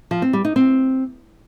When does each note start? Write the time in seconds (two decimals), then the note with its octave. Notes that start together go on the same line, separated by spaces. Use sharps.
0.11 F3
0.22 C4
0.33 G3
0.45 D#4
0.56 C4